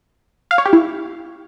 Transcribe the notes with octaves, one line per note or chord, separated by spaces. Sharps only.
F5
C#5
G4
E4